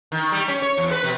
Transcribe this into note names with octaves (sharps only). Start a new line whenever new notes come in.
D#3
G3
C#4
C#5
E2
B4
B2